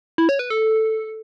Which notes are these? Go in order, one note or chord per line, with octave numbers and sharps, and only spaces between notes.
E4
C#5
B4
A4